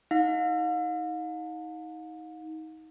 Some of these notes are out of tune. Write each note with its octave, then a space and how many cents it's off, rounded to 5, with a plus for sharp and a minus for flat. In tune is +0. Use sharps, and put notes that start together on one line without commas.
D#4 +30 F5 +45